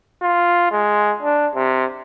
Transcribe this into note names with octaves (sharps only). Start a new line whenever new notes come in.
F4
G#3
D4
C3